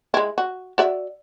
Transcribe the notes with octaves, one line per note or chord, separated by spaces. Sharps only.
G#3 E4
F#4
F#4 D5 E5